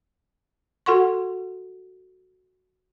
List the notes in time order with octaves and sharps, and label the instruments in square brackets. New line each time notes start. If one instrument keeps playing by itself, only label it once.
[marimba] F#4 A4 F#5 C6 C#6